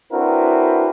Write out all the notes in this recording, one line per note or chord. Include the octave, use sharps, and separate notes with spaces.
C4 D4 E4 F#4 A#4 B4